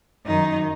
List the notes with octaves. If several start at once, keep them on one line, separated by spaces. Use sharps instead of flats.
F#2 D#3 D#4